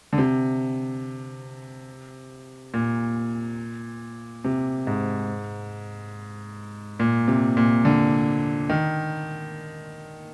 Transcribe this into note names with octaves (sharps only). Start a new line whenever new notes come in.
D3
C3
A#2
C3
G#2
A#2
C3
A#2
D3
D#3